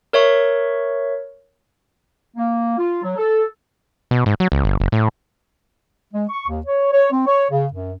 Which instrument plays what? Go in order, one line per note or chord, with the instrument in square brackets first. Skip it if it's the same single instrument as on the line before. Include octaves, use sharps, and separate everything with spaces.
[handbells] A#4 C#5 E5 C#6
[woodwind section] A#3
F4
F#3
A4
[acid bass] B2
G#2
F#3
C#2
G1
F#1
A2
[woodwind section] G#3
C#6
D#2
C#5
C#5
C4
C#5
C#3
F#2